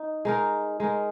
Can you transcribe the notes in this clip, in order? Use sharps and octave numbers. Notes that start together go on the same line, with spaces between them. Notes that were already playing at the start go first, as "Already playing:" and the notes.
Already playing: D#4
G#3 D#4 A#4
G#3 D#4 A#4